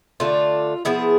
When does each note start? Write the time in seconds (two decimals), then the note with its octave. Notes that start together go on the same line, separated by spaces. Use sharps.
0.20 D3 A3 D4 F4
0.85 F3 B3 E4 G#4